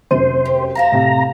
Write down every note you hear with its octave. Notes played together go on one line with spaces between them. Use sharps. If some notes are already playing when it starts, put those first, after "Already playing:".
F1 F#2 C5 D#7
G4
F4 E5 A5 A#5
A2 C3